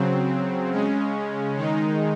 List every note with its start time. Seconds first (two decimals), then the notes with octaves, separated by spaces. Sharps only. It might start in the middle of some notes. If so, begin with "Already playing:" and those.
Already playing: C#3 F#3 C4
0.70 C#3 G#3 C#4
1.56 D#3 G#3 D#4